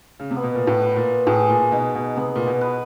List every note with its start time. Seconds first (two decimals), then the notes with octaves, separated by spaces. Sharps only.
0.20 C#3
0.31 C3
0.36 B3
0.43 B2
0.55 A#2
0.67 A2
0.82 B4
0.96 A#2
1.27 A2 G#4
1.50 A#2
1.72 B2 D#4
1.95 B2
2.16 C3 B3
2.36 A#2
2.47 B2
2.61 B4